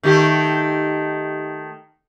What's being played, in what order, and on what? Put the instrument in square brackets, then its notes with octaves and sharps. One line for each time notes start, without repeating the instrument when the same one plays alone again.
[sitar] D#3 A3 G4